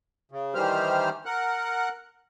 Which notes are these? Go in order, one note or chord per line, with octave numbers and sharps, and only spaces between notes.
C#3
D#3 E3 G3 G4 C5 F6
A#4 F#5 F#6